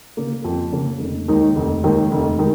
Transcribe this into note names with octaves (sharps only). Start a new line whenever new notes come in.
C#3 A#3
F2
C#3 A#3
F1
D#2 D#3 G#3 D#4
F1
D#2 D#3 G#3 D#4
F1
D#3 G#3 D#4